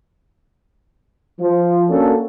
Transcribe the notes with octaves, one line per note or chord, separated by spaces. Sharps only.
F3
A#3 C#4 D4 F#4 A4